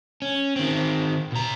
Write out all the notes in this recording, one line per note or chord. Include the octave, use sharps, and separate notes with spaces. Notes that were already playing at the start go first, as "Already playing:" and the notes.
C#4
D#3 C4
B2 A#5